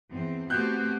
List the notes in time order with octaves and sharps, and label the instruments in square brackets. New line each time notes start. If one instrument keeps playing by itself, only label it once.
[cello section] E2 C4
[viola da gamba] A3 G4 [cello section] B3 C4 F#4 [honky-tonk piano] F#6 G6